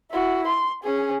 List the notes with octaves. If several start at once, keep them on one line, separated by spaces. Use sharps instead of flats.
E4 F#4
C6
C#4 G#4